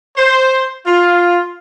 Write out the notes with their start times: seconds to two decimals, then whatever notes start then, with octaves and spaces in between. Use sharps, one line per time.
0.17 C5
0.87 F4